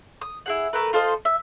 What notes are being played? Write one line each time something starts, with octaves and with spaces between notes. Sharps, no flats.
D#6
E4 G#4 F#5
A3 A#4 B4
F4 A4 C5 D#5
E5